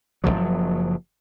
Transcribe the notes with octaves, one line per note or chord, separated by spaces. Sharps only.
F#1 F2 F3 F#3